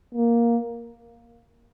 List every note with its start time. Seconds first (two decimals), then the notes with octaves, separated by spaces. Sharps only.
0.15 A#3